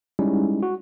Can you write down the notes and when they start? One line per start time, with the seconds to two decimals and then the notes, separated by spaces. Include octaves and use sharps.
0.19 G3 G#3 C#4 D#4 E4
0.63 F#4